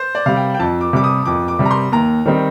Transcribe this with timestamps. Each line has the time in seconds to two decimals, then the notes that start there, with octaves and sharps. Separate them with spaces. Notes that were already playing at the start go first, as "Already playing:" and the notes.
Already playing: C5
0.15 D5
0.26 C3 G3 F5
0.37 G5
0.54 G5
0.60 F2 A5
0.81 D6
0.93 C3 G3 D6
1.04 D#6
1.26 F2 D6
1.48 D6
1.59 C3 G3
1.65 A#5
1.71 C6
1.92 D#2 A#5
2.26 D#3 G3 C4 D#4